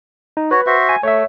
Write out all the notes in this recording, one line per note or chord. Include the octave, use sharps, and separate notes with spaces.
D#4
F#4 B4 C#5
F#4 C5 E5
G#5
A3 C#5 E5